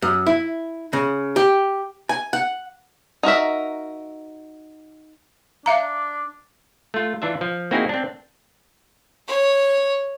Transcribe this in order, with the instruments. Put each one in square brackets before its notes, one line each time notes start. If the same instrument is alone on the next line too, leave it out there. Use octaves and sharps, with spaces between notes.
[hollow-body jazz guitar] F#2
E4
C#3
G4
G#5
F#5
[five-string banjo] D#4 F#4 A#4 E5
[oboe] D4 [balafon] E5 F5 A#5
[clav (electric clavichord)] A3 F4
E3 D4 F4 E5
F3
A#3 C4 D#4 E4 F#4 G#4
C4 D4
[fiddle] C#5